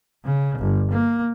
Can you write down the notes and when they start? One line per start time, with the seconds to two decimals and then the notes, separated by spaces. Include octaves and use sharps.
0.25 C#3
0.59 G1
0.91 A#3